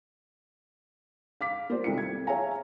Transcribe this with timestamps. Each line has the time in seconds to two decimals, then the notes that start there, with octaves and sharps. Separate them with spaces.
1.41 F5 D6 B6
1.70 A#3 F4 G4 C5 D5
1.84 C2 D#3 C4 F4 A4 C#7
1.98 G#6
2.27 G#4 C#5 E5 F5 G#5 A#5